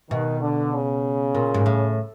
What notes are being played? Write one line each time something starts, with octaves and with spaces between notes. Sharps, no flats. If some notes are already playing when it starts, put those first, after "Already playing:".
B2 D#3
D3
C#3
A#2
G#2
A2